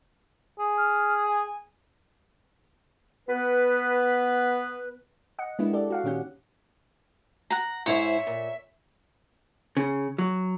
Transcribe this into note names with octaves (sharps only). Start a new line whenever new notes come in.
G#4
F6
G#5
B3 B4
D#5 F#5 C#7
G#3 A#3 B3 D4 E4
G4 A4 D5
F#4 F5 F#5
A#2 D#3 C#4 G4 F#5
F#5 A#5
G#2 E4 C5 C#5 E5
A#2
C#3
F#3